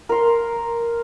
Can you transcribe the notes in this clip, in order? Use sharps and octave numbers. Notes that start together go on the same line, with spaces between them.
A#4 C6